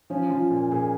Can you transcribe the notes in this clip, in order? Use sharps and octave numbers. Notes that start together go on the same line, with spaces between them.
F3 C#4
F3 F4
A#2
A#2 G#4